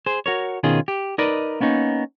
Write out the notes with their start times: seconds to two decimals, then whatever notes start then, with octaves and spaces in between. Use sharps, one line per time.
0.06 G#4 C5
0.26 F#4 A#4 C#5
0.63 B2 D#3 C#4 F4 G#4 D#5
0.88 G4
1.18 D#4 A#4 B4 D5 D#5
1.60 A#3 B3 C#4 D#4